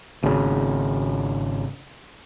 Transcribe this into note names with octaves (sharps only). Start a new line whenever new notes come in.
G#1 C#3